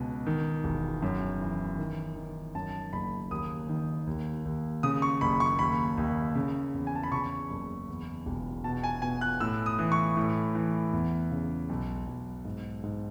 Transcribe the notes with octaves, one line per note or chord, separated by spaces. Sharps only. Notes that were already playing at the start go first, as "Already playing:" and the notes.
Already playing: C#2 B2
D#3
E1
F#2
E3
D#3
D#3
F#2 A5
F#1 B5
D#2 D#6
D#3
D#2
D#2
C#3 D#6
C#6
F#1 B5
C#6
D#2 B5
D#2
C#3
E2
G#5
A5
B5
C#3 C#6
F#1
E2
E1
B2 A5
G#5
B2 G#5
F#6
A2 E6
D#6
E3
C#6
A2
E3
E2
C#3
B1
B1
G#2
G#2